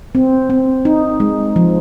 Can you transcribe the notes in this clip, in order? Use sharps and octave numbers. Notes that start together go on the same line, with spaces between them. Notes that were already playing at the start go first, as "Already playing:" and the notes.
C4
C4
D#4
G#3
F3